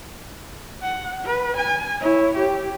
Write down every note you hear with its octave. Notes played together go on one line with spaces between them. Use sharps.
F#5
B4
G#5
E4 C#5
G4